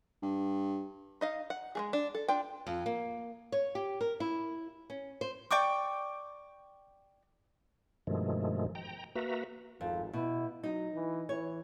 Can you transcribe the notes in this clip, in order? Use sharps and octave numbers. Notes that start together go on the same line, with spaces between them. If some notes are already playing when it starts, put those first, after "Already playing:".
G2
D#4 D#5 F5
F#5
G#3 A3 G#4
D4
A4
D4 F4 G5
F2
A#3
C#5
G4
A#4
E4
C#4
C5
D5 G5 C#6 D6
G2 B2 D#3 F3 G#3 A3
G5 A#5
A#3 F#4 B4 E5 A#5
G#1 F2
B2 E4
F#3 D#4
E3
E3 C#5